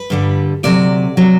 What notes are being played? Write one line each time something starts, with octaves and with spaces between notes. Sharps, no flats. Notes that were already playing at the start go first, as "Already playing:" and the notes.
Already playing: B4
G2 D3 G3
D2 C3 F#3 D5
C3 F#3